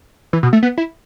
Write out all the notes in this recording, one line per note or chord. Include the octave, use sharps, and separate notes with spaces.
E3
B2
A3
B3
E4